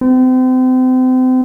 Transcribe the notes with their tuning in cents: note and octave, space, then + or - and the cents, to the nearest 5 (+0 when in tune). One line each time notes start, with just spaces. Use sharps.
C4 -35